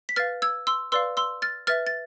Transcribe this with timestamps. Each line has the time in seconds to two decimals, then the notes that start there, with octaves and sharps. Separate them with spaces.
0.09 B6
0.16 B4 F5 F6 A6
0.42 E6 G#6
0.67 C6 E6
0.92 B4 D5 F5 C6 E6
1.17 C6 E6
1.42 F6 A6
1.67 B4 E5 F6 A6
1.87 A6